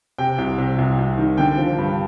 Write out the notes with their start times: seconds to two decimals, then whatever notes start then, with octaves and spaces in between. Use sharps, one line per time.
0.18 C3 G5
0.38 C2
0.58 C3
0.79 C2
0.99 C2
1.18 D#3
1.38 D3 G5
1.58 F3
1.78 G2